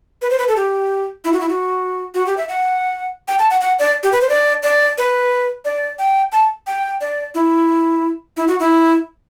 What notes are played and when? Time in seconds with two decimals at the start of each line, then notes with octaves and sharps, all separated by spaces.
0.22 B4
0.30 C5
0.39 B4
0.48 A4
0.56 G4
1.25 E4
1.33 F#4
1.41 E4
1.49 F#4
2.14 F#4
2.26 G4
2.37 E5
2.49 F#5
3.28 G5
3.39 A5
3.50 F#5
3.61 F#5
3.79 D5
4.03 G4
4.12 B4
4.21 C5
4.29 D5
4.63 D5
4.98 B4
5.65 D5
5.99 G5
6.32 A5
6.67 G5
7.01 D5
7.35 E4
8.37 E4
8.48 F#4
8.60 E4